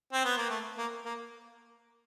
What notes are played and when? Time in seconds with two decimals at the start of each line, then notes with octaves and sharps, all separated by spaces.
0.13 C4
0.25 B3
0.37 A#3
0.50 A3
0.78 A#3
1.05 A#3